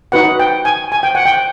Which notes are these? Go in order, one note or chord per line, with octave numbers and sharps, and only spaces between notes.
D#4 F#4 B4 F#5
G5
G#5
G#5
G5
F#5
G5